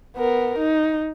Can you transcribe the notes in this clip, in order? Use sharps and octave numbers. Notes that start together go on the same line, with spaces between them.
B3 A#4
D#4